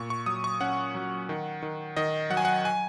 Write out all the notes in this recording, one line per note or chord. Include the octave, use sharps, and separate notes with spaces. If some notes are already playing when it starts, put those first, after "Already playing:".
Already playing: A#2 C#6
C#6
F#3 D#6
C#6
C#4 F#5
F#3
D#3
D#3
D#3 D#5
F#3 F#5
G#5
F#5
G#5